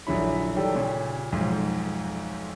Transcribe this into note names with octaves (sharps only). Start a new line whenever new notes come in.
A#1 D3 F#3 E4 B5
D#3 F#3 G3 G4 A4 D5
A#2 C#3 C#4
B1 F2 G#2